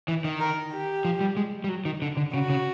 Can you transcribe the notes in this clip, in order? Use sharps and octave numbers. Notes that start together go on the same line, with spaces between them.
E3
D#3
A#4
G4
F3
G3
G#3
G3
F#3
D#3
D3
D3
C#3 F#4
C#3